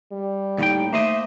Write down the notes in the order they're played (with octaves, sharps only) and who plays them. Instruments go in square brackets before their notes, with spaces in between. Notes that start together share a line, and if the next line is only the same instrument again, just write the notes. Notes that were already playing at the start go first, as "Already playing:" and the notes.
[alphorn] G3
[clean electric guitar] D#2 A2 G5 [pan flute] D#4
[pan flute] A3 [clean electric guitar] A#3 C5 D#5 [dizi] E5